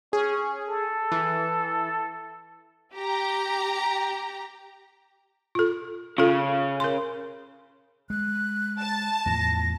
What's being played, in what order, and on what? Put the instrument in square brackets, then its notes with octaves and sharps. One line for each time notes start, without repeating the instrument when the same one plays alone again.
[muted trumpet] C#4 [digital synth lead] G#4
[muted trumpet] A4
[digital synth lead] E3
[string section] G4 A#5
[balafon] F4 A4
[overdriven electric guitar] C#3 [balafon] F4 A4
[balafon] A#4 C6
[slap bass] G#3 [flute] F#6
[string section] A5
[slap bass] E2 A2 F3 [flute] A#6